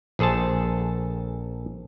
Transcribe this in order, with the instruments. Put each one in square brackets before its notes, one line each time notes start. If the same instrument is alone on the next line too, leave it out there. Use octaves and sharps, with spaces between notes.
[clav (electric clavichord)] A#1 G#4 A4 C5 A5